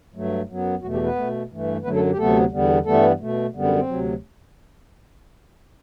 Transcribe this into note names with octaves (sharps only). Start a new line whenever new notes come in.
G2 F#3 A3
F#2 F#3 B3
E2 B2 F#3 A3 F#4
G3 G4
B3 B4
B2 A3
G2 E3 A3
F#2 D3 F#3 A3 B3 B4
A3 A4
G4
D2 C3 F#3 A3 B3 A4
E2 D3 G3 B3
G2 E3 G3 A3 B3 A4
B2 A3
F#2 D3 G3 B3
C4
C4
D2 C3 F#3